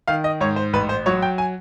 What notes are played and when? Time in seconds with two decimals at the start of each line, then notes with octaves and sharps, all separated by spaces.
0.08 D#3 F5
0.24 D#5
0.41 G#2 C#5
0.56 C5
0.73 A1 B4
0.89 C5
1.06 F#3 C#5
1.22 G5
1.38 G#5